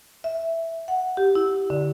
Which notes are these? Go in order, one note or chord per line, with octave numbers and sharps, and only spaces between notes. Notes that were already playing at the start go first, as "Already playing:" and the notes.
E5
F#5
G4
E4
D3